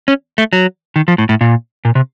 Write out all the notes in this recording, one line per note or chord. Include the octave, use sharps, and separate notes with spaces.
C#4
A3
F#3
D#3
F3
A2
A2
A#2
A#2
C3